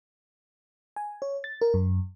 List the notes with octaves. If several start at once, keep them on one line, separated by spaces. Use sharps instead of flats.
G#5
C#5
A6
A#4
F#2